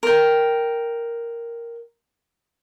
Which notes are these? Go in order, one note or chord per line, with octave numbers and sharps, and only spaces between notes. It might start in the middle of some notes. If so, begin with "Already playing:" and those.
A#4 G5